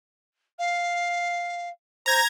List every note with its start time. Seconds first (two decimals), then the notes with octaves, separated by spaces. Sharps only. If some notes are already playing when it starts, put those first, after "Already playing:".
0.59 F5
2.06 C5 A#5 G#6 A#6